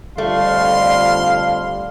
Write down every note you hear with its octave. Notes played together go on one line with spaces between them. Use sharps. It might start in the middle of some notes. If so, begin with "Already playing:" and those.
F2 D3 G3 A3 F5 C6